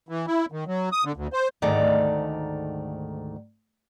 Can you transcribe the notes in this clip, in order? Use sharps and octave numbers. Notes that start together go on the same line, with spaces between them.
E3
E4
D#3
F#3
D#6
D3
D2
C5
D2 G#2 D#3 A3 D5 A#5